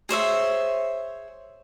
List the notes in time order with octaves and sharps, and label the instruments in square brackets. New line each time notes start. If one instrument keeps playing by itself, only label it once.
[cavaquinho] G#4 C5 C#5 E5